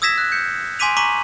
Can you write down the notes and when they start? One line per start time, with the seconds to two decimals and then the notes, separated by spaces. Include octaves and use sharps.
0.02 D#6 E6 G#6 A#6 B6 E7
0.18 F#6
0.32 G6 C#7
0.79 G#5 C6 D6 B6 D#7 F7
0.97 A#5 C#6 D6 B6 D#7 F#7